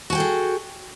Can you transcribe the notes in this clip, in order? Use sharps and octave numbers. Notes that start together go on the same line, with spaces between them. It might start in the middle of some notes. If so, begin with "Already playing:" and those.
F#4 G#4 A4 G5 G#5